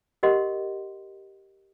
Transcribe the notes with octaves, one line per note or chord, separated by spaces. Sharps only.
G4 A#4 D#5 F#5 C6